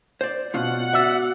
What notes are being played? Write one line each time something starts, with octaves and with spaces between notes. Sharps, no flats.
C5 D5
B2 C#4 F4 F#5
F#4 D5 E5